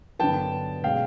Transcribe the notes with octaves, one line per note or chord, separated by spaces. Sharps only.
G2 D3 F#3 B3 G5 A5
B2 G#3 C#4 F5 G5